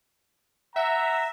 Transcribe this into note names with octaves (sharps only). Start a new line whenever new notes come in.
E5 F#5 A#5